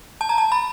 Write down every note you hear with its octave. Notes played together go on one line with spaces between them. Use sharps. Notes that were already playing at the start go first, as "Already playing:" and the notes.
A5
A#5
A5
B5